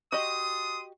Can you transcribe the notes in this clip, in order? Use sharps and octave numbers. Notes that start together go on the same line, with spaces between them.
D4 F#4 G4 D#5 C6 D#6